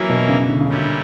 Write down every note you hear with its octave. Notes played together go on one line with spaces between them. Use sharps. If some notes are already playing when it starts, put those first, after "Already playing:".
Already playing: E3 F#3 A#3 C#4 E4
B2
C#3
D3
C#3
A#2 D3 G3 C#4 E4